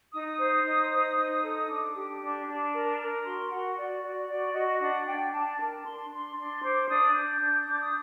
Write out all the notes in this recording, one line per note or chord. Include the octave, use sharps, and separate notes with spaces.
D#4 D#6
C5
D#4
C5
D#4
A4
D4 D6
G4
D4
D4
A#4
A#4
F#4 C6
F#4 F#5
F#4 D5
F#4 D5
F#4 D5
F#4 D#5
D4 F#5
D4 G5
D4 A5
A#4 A5
D4 C6
D4 C6
D4 C6
C5 D6
D4 D#6
D4 G6
D4
D4 D6
D#6